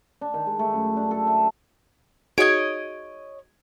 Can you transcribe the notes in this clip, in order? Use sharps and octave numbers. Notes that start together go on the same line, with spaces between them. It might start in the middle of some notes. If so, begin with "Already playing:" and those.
D4
D#3
G#3
A3
F#2
D4
A4
E5
D#4 F#4 G#4 C#5 D#5 G#6 D7